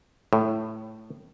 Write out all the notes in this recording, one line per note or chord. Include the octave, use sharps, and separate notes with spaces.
A2